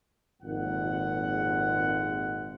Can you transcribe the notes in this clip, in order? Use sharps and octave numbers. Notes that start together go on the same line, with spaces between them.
G#1 F2 A#2 G#3 A#3 F#5